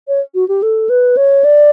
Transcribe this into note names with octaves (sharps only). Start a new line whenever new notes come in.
C#5
F#4
G4
A4
B4
C#5
D5